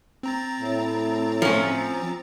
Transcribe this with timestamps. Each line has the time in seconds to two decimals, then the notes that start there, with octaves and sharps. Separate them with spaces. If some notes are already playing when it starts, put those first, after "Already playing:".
0.23 C4 A#5 A6
0.60 A2
1.42 F3 C#4